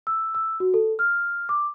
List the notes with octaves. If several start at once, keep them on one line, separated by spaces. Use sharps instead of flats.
E6
E6
F#4
A4
F6
D6